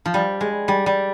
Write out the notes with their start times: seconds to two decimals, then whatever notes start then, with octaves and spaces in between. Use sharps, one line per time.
0.06 F3
0.14 G3
0.41 G#3
0.68 G3
0.86 G3